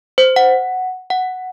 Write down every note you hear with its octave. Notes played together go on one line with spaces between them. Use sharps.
C5
F#5
F#5